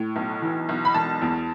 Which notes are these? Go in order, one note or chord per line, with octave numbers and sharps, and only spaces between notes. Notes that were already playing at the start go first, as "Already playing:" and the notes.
Already playing: A2
B1
E3
B1
B5
E1 A5
E2